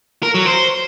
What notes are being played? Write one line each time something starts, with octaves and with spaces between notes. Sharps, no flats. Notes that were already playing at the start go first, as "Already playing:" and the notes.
A#4
F#3
C5